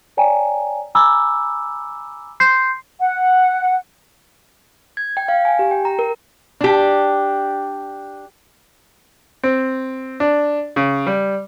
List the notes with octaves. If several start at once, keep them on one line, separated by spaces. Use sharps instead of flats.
C#5 D5 G5 G#5 A#5
G#5 A#5 B5 D6 E6
C6 G6 C7
F#5
G#6
G5
F5
G#5
G4
G5
A#5
A#4
D4 G4
C4
D4
C#3
G3